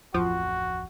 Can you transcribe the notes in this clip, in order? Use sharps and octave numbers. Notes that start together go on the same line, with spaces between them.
D1 A1 F2 F3 F#4